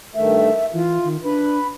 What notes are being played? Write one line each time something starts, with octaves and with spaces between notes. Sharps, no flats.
G2 D#3 A3 E5
E3 F4
D#3
D4 B4